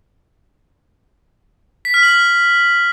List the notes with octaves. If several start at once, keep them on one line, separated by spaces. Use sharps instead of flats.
B6
F6
F#7